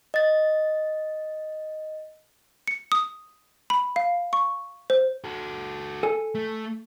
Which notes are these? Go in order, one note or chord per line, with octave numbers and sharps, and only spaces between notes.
D#5 A6
C#7
D#6
B5
F5
C#6
C5
F#4 A4
A4 G#5
A3